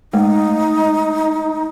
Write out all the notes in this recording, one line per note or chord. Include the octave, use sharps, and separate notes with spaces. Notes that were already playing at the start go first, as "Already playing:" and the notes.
G#3 A3 D#4